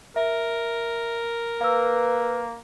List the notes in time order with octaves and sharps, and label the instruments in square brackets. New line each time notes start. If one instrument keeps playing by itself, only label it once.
[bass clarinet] A#4 [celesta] E5
[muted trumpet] A#3 [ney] B4 [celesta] F5 E6